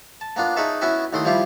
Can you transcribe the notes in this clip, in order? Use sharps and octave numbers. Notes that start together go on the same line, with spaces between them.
A5
A#3 B3 D4 F4
D#4 G#4 B4 C#5 E5 A5
B3 C#4 E4 F#4 E5 G#5
D#2 A3 E4 C6 D#6
F3 G3 E4 F4 G4 F5